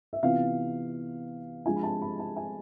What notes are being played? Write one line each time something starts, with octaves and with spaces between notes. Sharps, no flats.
E5
C3 E3 B3 F4 F5
F3 G#3 D4 F4 G#5
B5
A5
B5
A5
G#5